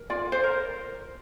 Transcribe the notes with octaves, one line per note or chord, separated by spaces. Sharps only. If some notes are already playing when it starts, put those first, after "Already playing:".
Already playing: A#4
F4 D5
C5
A#4